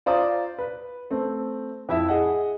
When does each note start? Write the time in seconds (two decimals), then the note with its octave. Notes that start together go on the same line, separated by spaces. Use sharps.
0.06 F4 C5 D5 A#5 D#6
0.58 B4
1.11 A3 C4
1.89 F2 E4 E5
2.09 G#4 D#5 F#5